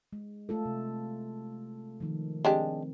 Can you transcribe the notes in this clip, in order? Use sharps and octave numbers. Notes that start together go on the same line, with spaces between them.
G#3
A3 F4 A4
C3
D#3 F3
G#3 C4 D4 G4